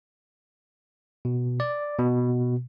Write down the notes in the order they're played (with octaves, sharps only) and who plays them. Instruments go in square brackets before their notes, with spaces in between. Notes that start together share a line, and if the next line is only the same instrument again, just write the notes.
[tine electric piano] B2
D5
B2